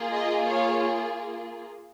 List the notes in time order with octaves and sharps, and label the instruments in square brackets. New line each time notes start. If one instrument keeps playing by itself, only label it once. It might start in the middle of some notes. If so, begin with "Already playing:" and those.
Already playing: [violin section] A#3 F4 G#4
D#5
C#5 F5